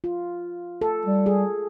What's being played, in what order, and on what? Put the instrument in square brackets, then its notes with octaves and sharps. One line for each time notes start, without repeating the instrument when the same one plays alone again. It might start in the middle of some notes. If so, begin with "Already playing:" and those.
[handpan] F4
A4
[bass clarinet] G3
[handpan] G#4